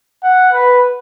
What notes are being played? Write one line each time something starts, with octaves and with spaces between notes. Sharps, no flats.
F#5
B4